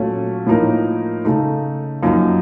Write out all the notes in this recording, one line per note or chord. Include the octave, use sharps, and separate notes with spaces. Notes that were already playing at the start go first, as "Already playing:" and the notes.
Already playing: A#2 F#3 A3 C#4
A2 F3 A#3 D#4 A#4
C#3 A3 D#4
F#2 F3 A#3 D#4